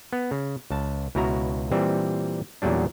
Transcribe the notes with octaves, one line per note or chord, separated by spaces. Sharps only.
B3
C#3
C#2 A5
C#2 B2 E4 F#4 A#5
A#2 E3 G3 C4
E2 A#2 F#3 G3 D4